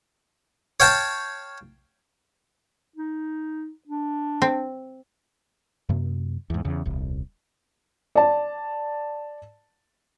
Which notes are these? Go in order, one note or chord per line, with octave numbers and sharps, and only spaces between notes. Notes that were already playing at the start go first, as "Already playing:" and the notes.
C#5 F5 G5 A5
D#4
D4
C4
F#2 C3 A#3
E2 G#2
E2 C#3
D#1 C2
D5 A5